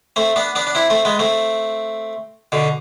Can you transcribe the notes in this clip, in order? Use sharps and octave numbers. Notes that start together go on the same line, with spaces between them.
A3 C4
B3 D4
B3 D4
D4
C4 E4
A3 C4
G#3 B3
A3 C4
B2 D3